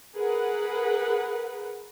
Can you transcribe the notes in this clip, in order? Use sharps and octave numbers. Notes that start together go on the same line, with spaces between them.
G#4 A#4 B4 F#5